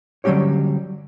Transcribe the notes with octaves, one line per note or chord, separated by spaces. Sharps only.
D3 F#3 G3 C#4 G4 C#5